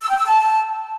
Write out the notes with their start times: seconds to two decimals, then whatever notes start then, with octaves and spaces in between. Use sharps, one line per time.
0.02 E6
0.10 G5
0.18 E6
0.25 A5